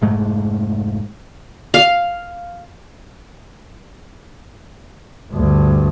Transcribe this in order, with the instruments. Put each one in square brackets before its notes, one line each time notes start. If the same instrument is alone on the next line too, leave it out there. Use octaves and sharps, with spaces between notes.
[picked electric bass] F1 G#2 G#3 A3
[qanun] F5
[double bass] D2 G2